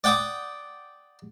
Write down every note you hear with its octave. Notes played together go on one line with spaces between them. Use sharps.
D5 F#5 G5 D6 D#6